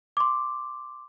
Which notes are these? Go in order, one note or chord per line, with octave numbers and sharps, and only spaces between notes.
C6 D6